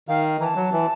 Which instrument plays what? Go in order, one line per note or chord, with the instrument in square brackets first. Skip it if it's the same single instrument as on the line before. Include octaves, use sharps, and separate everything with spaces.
[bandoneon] D#3 [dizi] F5
[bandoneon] E3 [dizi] A#5
[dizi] A5
[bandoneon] F#3
E3